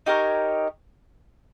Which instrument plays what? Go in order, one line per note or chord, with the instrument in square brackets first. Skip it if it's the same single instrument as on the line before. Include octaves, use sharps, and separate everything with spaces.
[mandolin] D#4 G4 A#4 C#5